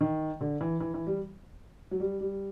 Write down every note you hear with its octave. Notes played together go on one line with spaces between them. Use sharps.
D#3
D3
E3
E3
E3
G3
F#3
G3
G3